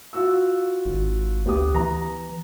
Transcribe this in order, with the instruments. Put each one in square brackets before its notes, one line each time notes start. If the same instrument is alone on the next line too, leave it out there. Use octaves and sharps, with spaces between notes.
[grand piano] F4 F#4 E6
[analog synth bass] G#1
[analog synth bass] D2 [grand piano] B3 G4 D#6
[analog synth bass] E3 [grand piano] A#5